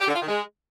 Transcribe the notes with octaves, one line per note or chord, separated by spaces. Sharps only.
G4
D3
F4
D#3
G#3